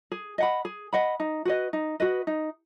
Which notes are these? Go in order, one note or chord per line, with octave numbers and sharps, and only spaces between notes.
G#4
D#5 F#5 B5
G#4
D#5 F#5 B5
D#4
F#4 B4 D#5
D#4
F#4 B4 D#5
D#4